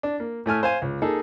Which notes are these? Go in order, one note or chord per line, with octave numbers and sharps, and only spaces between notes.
D4
A#3
A2 A3 G#5 F6
C5 F5 G#5
C#2
A#3 D#4 G#4 A4